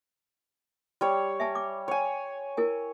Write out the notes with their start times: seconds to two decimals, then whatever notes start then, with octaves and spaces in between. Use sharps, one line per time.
1.01 G3 C#5
1.40 E5 G#5 A5
1.55 D6
1.88 C#5 G#5
2.57 E4 A#4 G#5